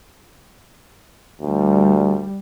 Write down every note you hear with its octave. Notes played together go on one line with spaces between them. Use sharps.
D2 G3